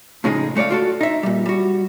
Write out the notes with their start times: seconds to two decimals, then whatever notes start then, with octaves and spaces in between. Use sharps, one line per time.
0.24 A2 C#3 F3 G#3 D#4 G#4
0.55 G#2 A3 C#5 D5 F5
0.70 F4 F#4 A4
1.01 D#4 E5
1.23 A#2 G3
1.46 G3 F#4